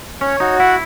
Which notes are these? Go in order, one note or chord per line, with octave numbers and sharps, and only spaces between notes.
C#4 C#5
D#4 F#4
E4 F#5